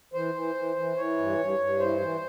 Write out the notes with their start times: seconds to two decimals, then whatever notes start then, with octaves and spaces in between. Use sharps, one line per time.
0.14 E3 C5
0.34 E3
0.55 E3
0.76 E3
0.96 E3 C#5
1.18 G2
1.38 G2
1.58 G2
1.79 E3 C5
2.00 E3